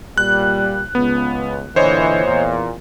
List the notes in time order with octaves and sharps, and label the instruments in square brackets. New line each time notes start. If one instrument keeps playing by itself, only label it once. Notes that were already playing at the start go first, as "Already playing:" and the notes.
[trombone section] A#2 G3 [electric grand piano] F#6
[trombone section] C#2 [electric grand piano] B3
[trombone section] A#2 D3 E3 [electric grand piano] C5 C#5 D#5
[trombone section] E2 A#2